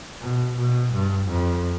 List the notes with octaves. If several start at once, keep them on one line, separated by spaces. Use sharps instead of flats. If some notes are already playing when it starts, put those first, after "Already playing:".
B2
B2
G2
F2